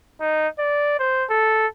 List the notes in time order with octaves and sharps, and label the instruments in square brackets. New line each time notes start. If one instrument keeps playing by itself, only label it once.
[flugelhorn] D#4
D5
C5
A4